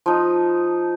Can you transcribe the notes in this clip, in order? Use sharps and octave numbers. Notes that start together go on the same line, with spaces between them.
F3 D#4